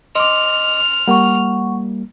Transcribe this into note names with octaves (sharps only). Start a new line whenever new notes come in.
D#5 C6 D6 F6
G3 A#3 F#5 C#6